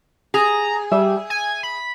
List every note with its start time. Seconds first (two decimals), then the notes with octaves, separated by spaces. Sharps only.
0.34 G#4 A#5
0.92 G3 E5
1.30 G#5
1.63 B5